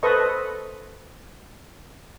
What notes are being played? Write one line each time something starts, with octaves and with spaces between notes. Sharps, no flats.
A4 B4 C5 D#5 C#6